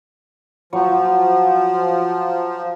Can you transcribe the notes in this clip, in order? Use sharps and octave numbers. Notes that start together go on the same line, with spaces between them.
F3 F#3 C#6